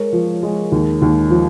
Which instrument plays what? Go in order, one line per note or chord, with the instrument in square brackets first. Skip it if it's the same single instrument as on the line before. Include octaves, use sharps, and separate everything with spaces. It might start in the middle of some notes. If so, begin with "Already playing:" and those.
Already playing: [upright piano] G#3 A#4 C#5
F3
G#3
D#2
D#2
F3